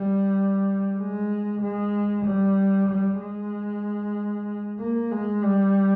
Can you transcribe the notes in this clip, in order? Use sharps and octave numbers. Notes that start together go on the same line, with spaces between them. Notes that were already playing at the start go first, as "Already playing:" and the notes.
Already playing: G3
G#3
G#3
G3
G3
G#3
A#3
G#3
G3